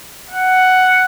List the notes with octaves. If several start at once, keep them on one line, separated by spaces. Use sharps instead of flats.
F#5